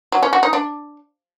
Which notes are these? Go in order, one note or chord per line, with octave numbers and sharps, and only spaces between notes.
F#3
C#4
F#4
D#4
D4